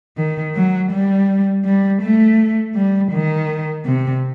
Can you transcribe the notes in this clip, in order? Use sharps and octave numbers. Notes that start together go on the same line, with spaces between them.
D#3
F#3
G3
G3
A3
G3
D#3
C3